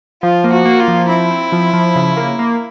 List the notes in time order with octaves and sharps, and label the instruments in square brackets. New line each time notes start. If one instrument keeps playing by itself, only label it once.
[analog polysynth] F3 [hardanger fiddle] F4
[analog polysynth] A#3
[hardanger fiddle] F#4
[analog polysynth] A#3
[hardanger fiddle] F4
[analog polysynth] F3
[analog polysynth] C4 [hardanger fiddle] E4
[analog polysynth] C4
F3
F3
C#3
A#3
A#3